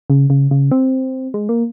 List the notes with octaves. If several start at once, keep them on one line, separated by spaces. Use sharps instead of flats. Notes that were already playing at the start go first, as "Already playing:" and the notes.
C#3
C#3
C#3
C4
G#3
A#3